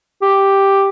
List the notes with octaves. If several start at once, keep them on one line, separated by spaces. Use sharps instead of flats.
G4